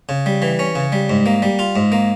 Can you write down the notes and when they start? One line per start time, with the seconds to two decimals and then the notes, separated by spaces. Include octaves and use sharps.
0.09 C#3
0.26 G3
0.42 E3
0.59 C#4
0.75 C#3
0.92 G3
1.10 G#2
1.26 A#3
1.42 G3
1.59 F4
1.76 G#2
1.92 A#3